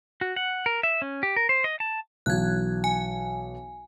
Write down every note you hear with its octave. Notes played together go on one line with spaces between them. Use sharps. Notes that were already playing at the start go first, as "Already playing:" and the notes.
F#4
F#5
A#4
E5
C#4
G4
A#4
C5
D#5
A5
B1 E3 F#3 F#6 G#6
G#5